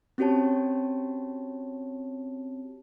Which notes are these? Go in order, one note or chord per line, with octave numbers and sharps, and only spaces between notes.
C4 C#4 F#4 G4 C#5 A5